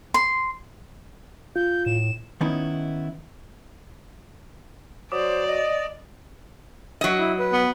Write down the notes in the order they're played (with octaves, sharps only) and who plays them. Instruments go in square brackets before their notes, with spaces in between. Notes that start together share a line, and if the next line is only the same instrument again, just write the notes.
[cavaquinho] C6
[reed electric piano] F4 [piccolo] G6
[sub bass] A2 [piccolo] E7
[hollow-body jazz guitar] D#3 B3 C#4 D#4 E4
[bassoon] F#3 [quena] C5 [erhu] D5 [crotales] D6 D#6
[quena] D#5
[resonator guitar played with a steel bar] F#3 D#5
[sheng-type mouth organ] E4
B4
[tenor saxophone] B3